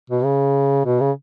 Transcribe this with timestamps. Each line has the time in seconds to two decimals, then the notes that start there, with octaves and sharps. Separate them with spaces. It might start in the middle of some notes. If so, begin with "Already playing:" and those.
0.10 B2
0.24 C#3
0.85 B2
1.01 C#3